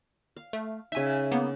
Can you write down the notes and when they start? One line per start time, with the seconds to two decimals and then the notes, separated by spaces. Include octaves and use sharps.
0.36 F5
0.53 A3
0.92 C#3 D#4 E5 G#5
1.32 A#3 B3